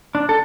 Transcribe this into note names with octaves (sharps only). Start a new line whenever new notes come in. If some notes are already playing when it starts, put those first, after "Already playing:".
D4
A4